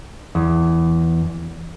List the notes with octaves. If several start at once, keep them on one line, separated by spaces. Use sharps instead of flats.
E2